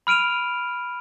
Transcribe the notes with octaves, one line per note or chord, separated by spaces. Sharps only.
B5 F6 D7 D#7 F7